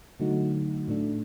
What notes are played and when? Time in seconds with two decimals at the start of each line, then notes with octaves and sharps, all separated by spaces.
0.20 D3 F#3 A3 D#4 F#4
0.88 A2 A3 D4